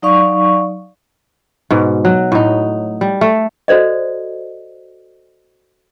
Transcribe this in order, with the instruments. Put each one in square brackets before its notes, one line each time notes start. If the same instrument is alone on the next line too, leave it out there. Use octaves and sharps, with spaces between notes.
[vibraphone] F#3 D#4 D5 F5 C#6
[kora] G#2 B2
F#3
A2 D#4
G3
A3
[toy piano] F#4 A4 C5 D5 D#5